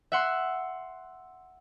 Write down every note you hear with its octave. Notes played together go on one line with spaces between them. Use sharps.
E5 F#5 C6